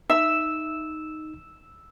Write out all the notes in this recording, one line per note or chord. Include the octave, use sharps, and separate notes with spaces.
D#4 E5 E6